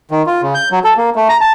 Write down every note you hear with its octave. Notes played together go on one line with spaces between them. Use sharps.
D#3
F4
C#3
G6
F#3
A4
A#3
A3
A#5
A5